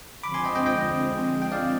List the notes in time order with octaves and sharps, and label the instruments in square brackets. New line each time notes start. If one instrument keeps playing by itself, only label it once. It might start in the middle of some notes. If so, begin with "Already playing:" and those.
[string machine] D3 F3 G#3 C4 [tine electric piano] B5 D6
[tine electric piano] G#5 C6
D#5 G5
D#5 G5
D#5 G5
G5
D5 F5